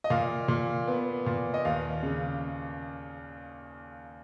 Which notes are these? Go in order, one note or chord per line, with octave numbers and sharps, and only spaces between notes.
D#5
A#2 F5
A#2
B3
A#2
D#5
D#2 F5
C#3